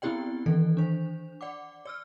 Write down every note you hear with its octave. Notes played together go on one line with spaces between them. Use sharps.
B3 C4 E4 G4 D5 G5
D#3 E3 A4
D4 C5
D5 F#5 D6
D5 E6 F6